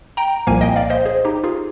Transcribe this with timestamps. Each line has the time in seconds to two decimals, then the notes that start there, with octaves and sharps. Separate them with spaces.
0.17 G5 A#5
0.47 C2 A#2 F3 A#3 F5 G#5
0.61 D#5 G5
0.76 D5 F5
0.90 C5 D#5
1.06 G#4 C5
1.25 D#4 G4
1.44 F4 G#4